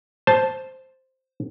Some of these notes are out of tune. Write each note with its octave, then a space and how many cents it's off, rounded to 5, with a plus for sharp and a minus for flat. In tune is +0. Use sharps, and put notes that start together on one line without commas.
C5 +0 A5 +0